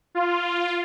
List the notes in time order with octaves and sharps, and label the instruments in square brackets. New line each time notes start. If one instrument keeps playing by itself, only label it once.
[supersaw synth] F4